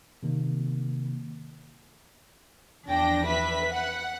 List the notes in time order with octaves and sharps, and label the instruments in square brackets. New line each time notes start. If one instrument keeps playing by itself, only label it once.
[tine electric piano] C3 D#3 A#3
[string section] E2 F3 D4 G5 A#6
B4 E5 B6
F#5